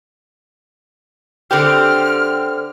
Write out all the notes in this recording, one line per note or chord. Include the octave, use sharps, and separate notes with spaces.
D3 C4 G4 F6